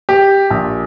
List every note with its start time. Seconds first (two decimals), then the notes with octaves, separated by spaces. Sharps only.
0.09 G4
0.50 A#1